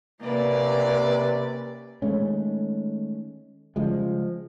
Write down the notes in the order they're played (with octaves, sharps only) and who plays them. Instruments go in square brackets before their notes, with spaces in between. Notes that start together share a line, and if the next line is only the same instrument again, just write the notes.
[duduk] C3 [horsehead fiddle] A#3 [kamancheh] C#4 B4 [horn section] D5
[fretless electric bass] D#3 G#3 A3 C#4
C#3 F3 G3 G#3